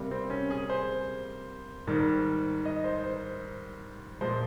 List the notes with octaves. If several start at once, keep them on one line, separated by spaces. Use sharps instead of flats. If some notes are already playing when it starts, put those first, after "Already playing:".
Already playing: C3 G3 A#3
C4
C#4
G#4
C5
G#2 D#3 G3
D#5
C5
C5
A#2 F3 G#3 C5